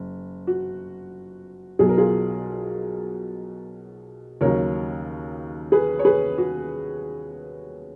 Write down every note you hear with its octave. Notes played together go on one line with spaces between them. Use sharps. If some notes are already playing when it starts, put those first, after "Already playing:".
Already playing: F#1
F#4
B1 B2 F#3 G#4
A#4
F4 G#4
D#2 C#3 F#3 A#4 C#5
G#4 B4
C#5
G#4 B4
F#4